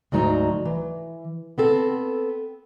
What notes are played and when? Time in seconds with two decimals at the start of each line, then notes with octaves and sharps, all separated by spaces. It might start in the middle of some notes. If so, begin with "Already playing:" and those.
0.12 D2 G#2 F#3 D#4 A#5
0.65 E3
1.58 B3 C4 A4